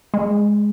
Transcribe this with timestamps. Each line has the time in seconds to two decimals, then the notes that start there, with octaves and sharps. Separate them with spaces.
0.14 G#3